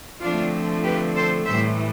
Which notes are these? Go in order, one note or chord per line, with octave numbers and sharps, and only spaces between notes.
D3 F3 A3 C4 D4 F4
G4 B4
A4 C5
A2 E3 G3 C5 E5